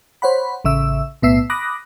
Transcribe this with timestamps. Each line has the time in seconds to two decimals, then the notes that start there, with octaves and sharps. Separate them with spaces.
0.22 C5 C#5 F#5 B5
0.65 A1 C#3 E5 E6
1.22 B1 A2 B3 E5 E6 C7
1.50 B5 D6 D#6 F#6 A#6